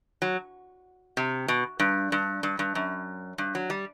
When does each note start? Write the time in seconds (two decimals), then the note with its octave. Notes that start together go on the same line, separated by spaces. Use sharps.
0.22 F#3
1.17 C3
1.48 B2
1.80 G2
2.12 G2
2.43 G2
2.59 G2
2.75 F#2
3.38 G2
3.55 F#3
3.70 G3